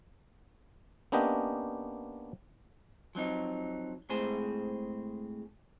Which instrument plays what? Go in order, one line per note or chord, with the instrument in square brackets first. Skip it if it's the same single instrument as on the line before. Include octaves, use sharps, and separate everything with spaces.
[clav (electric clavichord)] A#3 B3 C#4 D4 G4 D#5
[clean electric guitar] F3 F#3 C4 D#4
A2 G#3 C4 G#4 C5